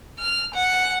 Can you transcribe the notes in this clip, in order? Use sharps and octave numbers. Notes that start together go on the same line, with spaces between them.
F6
F#5